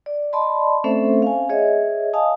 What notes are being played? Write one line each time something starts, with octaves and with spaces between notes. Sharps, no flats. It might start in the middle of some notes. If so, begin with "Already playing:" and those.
D5
D5 D#5 A5 B5 C6
A3 C4 C#4 A4 C5 E5
F5 G#5
G#4 C#5 D#5 E5
D#5 F5 G#5 A5 D#6